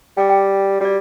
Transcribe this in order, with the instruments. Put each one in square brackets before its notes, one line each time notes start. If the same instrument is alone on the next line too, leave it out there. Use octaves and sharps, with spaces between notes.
[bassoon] G3 [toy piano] G5 D6
[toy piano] G5
[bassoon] G3 [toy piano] F#4 D5